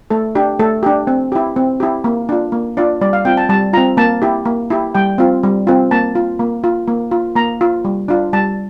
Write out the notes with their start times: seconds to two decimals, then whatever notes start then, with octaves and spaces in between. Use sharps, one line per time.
0.10 A3 A4
0.35 D4 G4
0.59 A3 A4
0.83 D4 G4
1.07 C4
1.32 E4 G4
1.56 C4
1.80 E4 G4
2.04 A#3
2.29 D4 F4
2.52 A#3
2.77 D4 F4 D5
3.01 G3 D5
3.13 F5
3.25 C4 F4 G5
3.37 A5
3.49 G3 A5
3.73 C4 F4 A#5
3.97 A#3 A5
4.22 E4 G4
4.45 A#3
4.70 E4 G4
4.95 G3 G5
5.18 C4 F4
5.43 G3
5.67 C4 F4
5.91 A#3 A5
6.15 F4
6.40 A#3
6.64 F4
6.88 A#3
7.11 F4
7.36 A#3 A#5
7.61 F4
7.85 G3
8.08 D4 F4
8.33 G3 A5